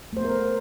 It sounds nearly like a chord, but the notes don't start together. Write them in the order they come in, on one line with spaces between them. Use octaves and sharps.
A3 C5 B3 A#4